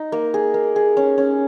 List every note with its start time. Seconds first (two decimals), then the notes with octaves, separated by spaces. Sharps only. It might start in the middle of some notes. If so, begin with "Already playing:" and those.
Already playing: D#4
0.12 A#3
0.34 G#4
0.54 A#3
0.76 G#4
0.97 C#4
1.18 C#4